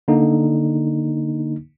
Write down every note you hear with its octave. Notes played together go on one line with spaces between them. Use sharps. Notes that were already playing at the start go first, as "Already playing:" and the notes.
D3 A#3 D#4